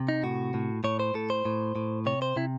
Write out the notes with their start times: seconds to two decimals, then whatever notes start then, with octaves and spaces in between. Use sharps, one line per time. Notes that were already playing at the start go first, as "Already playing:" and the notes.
Already playing: C3
0.09 D#4
0.23 A2 F#4
0.54 A2
0.84 A2 C#5
1.00 C5
1.14 A2 A4
1.30 C5
1.45 A2
1.76 A2
2.06 C3 C#5
2.22 C5
2.36 C3 E4